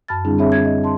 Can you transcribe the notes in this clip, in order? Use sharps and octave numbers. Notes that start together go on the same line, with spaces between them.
F#2 A5 B5 F6 A6
D3 G3 C4 D4 E4 G#4
C4 D4 G#4 C#5 E5 B5
G#6
D#5
A5 C6